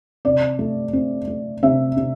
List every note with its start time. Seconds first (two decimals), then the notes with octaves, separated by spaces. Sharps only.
0.25 C3 D5
0.59 A3
0.93 C4
1.28 A3
1.63 C3 E5
1.97 C3